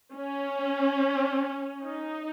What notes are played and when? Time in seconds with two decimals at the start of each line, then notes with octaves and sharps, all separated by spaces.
0.15 C#4
1.84 D#4